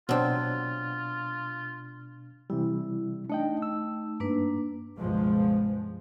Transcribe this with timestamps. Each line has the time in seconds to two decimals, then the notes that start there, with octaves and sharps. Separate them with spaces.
0.09 B2 F#3 C4 D4 F4
2.50 C3 E3 G3 E4
3.30 A3 D4 D#4 D#5 G5
3.62 E6
4.20 G2 A#3 D4 B4
4.97 C#2 G2 B2 F3 G#3